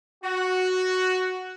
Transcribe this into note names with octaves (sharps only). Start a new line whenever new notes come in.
F#4